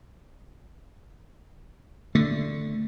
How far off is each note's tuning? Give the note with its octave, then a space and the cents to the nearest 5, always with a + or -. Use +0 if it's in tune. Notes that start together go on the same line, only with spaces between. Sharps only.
D3 +0 A3 +0